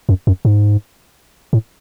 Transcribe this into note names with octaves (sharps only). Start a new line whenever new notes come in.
F#2
F#2
G#2
A2